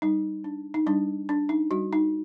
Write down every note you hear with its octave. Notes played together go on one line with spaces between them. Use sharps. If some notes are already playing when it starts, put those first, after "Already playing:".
G3 D#4
D4
D#4
G3 D4
D4
D#4
G3 F#4
D#4